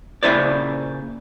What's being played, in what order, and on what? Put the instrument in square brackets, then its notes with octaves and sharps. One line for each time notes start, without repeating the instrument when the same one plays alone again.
[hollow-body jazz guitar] A#2 C#3 E3 E4 C5 D5